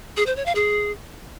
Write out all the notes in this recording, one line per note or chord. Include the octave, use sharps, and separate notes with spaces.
G#4
C5
C#5
F5
G#4